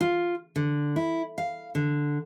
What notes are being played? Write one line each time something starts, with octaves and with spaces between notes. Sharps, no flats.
F4
D3
E4
F5
D3